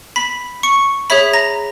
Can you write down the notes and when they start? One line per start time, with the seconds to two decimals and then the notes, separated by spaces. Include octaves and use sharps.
0.16 B5 B6
0.63 C#6 C#7
1.10 G#4 C#5 E5 B5 B6
1.33 A#5 A#6